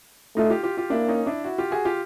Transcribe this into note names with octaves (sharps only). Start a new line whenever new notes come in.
A3 D#4 F4
F4 G4
F4 G4
F4 G4
A#3 D4 E4
C#4 D#4
D4 E4
E4 F#4
F4 G4
F#4 G#4
F4 G4